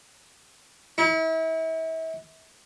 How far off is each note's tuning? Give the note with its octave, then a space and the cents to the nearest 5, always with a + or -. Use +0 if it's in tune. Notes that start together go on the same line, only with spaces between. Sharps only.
E4 -35